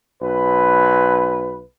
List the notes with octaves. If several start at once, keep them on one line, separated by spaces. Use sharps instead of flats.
B1 B4